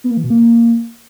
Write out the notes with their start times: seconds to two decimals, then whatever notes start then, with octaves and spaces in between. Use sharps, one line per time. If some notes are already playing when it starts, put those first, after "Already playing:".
0.04 B3
0.11 A#3
0.17 E3
0.24 B2
0.30 A#3